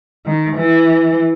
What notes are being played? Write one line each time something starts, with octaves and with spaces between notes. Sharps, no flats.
D#3
E3